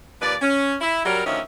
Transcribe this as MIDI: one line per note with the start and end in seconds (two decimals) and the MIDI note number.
0.21 0.35 39
0.21 0.35 53
0.21 0.35 71
0.21 0.35 74
0.42 0.75 61
0.81 1.05 64
1.05 1.25 54
1.05 1.25 55
1.05 1.25 70
1.26 1.41 38
1.26 1.41 51
1.26 1.41 53
1.26 1.41 61
1.26 1.41 75
1.26 1.41 76